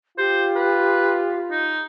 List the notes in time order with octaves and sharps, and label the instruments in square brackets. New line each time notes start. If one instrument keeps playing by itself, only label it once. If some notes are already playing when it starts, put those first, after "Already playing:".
[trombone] F4 [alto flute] G4 [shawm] C5
[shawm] B4
D#4